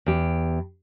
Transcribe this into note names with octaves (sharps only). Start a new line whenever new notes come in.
E2 G4